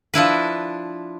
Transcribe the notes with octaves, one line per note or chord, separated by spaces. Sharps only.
F3 D4 E4 B4